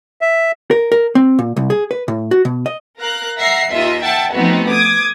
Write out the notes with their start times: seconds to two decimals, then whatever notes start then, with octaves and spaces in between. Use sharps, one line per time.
0.21 E5
0.71 A#4
0.92 A#4
1.15 C4
1.39 A#2
1.57 C2
1.70 G#4
1.91 B4
2.08 A2
2.31 F#4
2.45 B2
2.66 D#5
2.98 A#4 F5 A#5 F#6
3.38 E5 F#5 A#5 A#6 C7
3.72 D#2 F4 D#5 E5
4.02 E5 F#5 G5 A5
4.33 F3 A3 B3 C4 D#4 F#4
4.69 D6 D#6 G#6